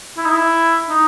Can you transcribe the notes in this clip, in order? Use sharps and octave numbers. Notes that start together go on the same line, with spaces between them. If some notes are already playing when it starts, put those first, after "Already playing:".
E4
D#4
E4
D#4